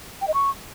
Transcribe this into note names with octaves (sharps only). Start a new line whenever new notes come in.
G5
D#5
C#6